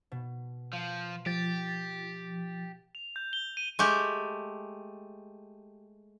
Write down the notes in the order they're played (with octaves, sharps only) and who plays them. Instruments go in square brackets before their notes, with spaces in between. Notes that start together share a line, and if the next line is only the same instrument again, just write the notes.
[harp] B2
[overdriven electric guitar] F3 [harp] F5
[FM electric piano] F3 A6 [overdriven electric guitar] G4
[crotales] F7
G6
G7
D#7
[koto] G#3 A3 G4